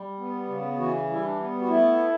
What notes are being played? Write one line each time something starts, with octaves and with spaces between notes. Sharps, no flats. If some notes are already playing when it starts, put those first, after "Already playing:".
Already playing: G3
B3
C#3
E3 F#4
G3 E4
D4
B3
F#4
A3 E4